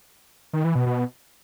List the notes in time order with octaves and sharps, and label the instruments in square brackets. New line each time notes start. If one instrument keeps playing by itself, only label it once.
[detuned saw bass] D#3
E3
B2
B2